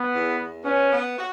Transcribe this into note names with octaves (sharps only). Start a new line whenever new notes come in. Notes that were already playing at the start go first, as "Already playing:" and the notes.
Already playing: B3
E2
E2
B3 C#4
B3
F#4